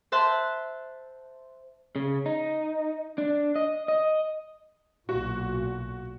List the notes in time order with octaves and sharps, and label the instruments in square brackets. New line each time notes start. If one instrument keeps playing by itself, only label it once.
[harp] C5 E5 A5 C6 F#6
[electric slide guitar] C#3
D#4
D4
D#5
D#5
[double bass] B1 A#2 [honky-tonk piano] F#4